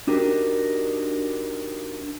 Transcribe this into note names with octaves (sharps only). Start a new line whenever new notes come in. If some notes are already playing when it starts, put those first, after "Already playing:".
D4 D#4 F#4 G4 A#4